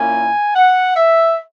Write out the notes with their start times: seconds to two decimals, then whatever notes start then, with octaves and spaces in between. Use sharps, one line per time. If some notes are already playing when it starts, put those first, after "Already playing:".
Already playing: A#2 A#3 C#4 E4 G#5
0.55 F#5
0.96 E5